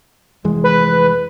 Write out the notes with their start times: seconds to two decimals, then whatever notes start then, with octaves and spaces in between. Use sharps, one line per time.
0.44 F1 E3 G#3
0.64 B4